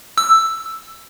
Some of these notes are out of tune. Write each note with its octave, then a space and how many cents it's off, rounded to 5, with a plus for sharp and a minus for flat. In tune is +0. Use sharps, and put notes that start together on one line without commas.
E6 +5